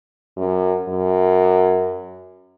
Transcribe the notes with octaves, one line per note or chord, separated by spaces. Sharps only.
F#2
F#2